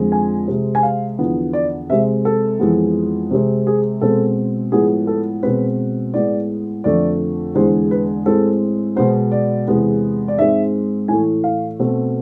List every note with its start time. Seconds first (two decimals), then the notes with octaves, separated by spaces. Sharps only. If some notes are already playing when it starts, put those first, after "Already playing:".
Already playing: F2 D3 F3 G#3 C4
0.12 G#5
0.48 C3 G#3 C4
0.75 G#5
0.83 F5
1.19 E2 D3 F3 B3
1.53 D5
1.90 C3 G#3 C4 E5
2.25 A4
2.59 F2 E3 G#3 B3
3.31 C3 G#3 C4
3.67 G#4
4.01 B2 G#3 C4 A4
4.72 A2 F3 G#3 B3 G#4
5.07 A4
5.43 B2 G#3 C4 B4
6.14 A2 G#3 B3 D5
6.84 F2 D3 A3 D5
7.55 E2 D3 G#3 C5
7.91 B4
8.26 A2 G#3 C4 A4
8.96 B2 G#3 B3 C5
9.32 D5
9.67 E2 C3 G#3 B3
10.28 D5
10.38 G#2 G#3 C4 E5
11.08 A2 E3 A3 G#5
11.44 F5
11.79 B2 A3 C4